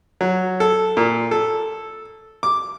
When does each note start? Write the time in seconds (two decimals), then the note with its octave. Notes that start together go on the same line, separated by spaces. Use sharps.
0.21 F#3
0.60 A4
0.97 A#2
1.31 A4
2.43 D6